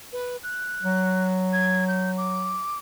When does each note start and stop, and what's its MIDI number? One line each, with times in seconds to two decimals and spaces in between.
0.12 0.37 71
0.43 1.25 90
0.83 2.61 54
1.53 1.84 92
1.88 2.11 91
2.17 2.78 86